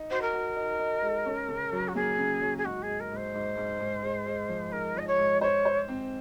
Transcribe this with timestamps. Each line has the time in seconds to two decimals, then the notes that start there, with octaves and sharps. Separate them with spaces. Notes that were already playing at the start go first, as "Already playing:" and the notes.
Already playing: D#4
0.10 F#4 C5
0.21 A#4
0.33 F#4
0.56 D#4
0.79 D#4
1.02 G#3
1.26 C#4
1.48 C#3
1.72 F#3
1.88 F#4
1.95 A#3 G#4
2.19 C#3
2.42 F#3
2.57 G#4
2.64 G#2 F#4
2.82 G#2 G#4
3.00 A#4
3.11 G#2 C5
3.34 G#2
3.57 G#2
3.79 G#2
4.03 G#3
4.26 G#3
4.49 F3
4.72 G#2 A#4
4.95 F3 D#5
5.07 C#5
5.18 G#2
5.41 C5 C#5
5.65 C5
5.88 C4